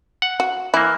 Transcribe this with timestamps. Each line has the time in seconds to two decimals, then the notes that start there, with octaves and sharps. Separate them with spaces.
0.22 F#5
0.40 F#4
0.74 E3 A#3 E4